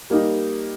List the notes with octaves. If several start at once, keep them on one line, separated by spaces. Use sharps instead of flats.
G3 A#3 D#4 G4